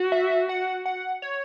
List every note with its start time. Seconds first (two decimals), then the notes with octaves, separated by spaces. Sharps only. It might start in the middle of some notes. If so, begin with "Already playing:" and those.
Already playing: F#4
0.12 E5
0.49 F#5
0.85 F#5
1.22 C#5